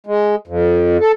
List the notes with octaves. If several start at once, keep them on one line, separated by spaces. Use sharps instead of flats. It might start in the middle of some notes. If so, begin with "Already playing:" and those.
G#3
F2
A4